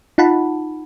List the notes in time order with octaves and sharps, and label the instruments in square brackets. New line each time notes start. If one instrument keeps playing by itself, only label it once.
[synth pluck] D#4 F4 F#5 A5 B5